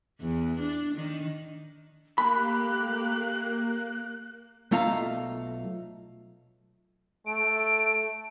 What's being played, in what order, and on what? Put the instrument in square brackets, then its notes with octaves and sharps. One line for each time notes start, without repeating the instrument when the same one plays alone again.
[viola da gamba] E2
D4
D#3
[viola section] A3 G4 [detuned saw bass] A#3 [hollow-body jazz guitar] B5 [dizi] F#6
[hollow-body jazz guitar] B1 A3 F4 F5 A#5
[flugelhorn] A3 [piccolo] D7